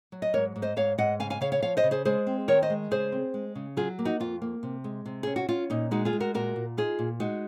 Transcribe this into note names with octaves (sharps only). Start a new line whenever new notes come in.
F#3
D#5
G#2 A#4 C#5
G#2
C5 D#5
G#2 C#5 F5
G#2 D#5 F#5
C#3 F5 G#5
F5 G#5
C#3 C#5 F5
C#5 F5
F3 C#5 F5
C5 D#5
C#3
G#4 C5
G#3 G#4 C5
C4
D#3 A#4 C#5
C5 D#5
G#3
C#3 G#4 C5
C4
G#3
C#3
F#3 F4 G#4
A#3
D#4 F#4
F2 F4
A#3
C3
G#3
C3
C#4 G#4
F#4
C#4 F4
A#2 D#4
G#3 D#4 F#4
F4 G#4
G#3
F#4 A#4
A#2 F#4 A#4
A#2
D#4 F4 G#4
A#2
G#3 D#4 F#4